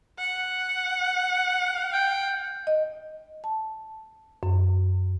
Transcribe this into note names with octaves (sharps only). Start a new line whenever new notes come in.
F#5
G5
D#5
A5
F#2